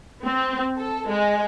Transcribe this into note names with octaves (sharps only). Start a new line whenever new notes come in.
C4
A4
G#3